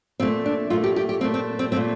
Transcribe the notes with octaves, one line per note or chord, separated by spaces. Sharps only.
A#2 A3 C4
D4
A#2 A3 F4
G4
G4
G4
A#2 A3 C4
C4
C4
A#2 A3 C4